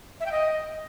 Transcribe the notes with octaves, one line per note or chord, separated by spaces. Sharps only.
E5
G5
D#5